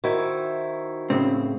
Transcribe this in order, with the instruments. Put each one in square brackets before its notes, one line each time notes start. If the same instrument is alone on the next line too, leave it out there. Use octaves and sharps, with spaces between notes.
[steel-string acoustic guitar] D#3 E4 [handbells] F#4 C5 G#6
[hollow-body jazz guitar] A2 C#3 C4